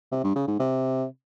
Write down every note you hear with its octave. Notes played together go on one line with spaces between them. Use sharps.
C3
G2
C#3
G#2
C3